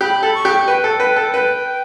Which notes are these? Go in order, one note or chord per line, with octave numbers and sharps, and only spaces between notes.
G4 B5
A4
C#6
G4
B4 G5
A4
B4
A4
B4